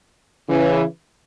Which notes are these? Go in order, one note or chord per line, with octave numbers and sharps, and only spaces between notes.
C#3 E3